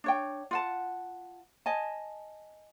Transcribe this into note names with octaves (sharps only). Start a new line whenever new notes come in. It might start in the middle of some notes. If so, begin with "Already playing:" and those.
D4 C#5 G5
F4 F#5 A5
D#5 G#5 A5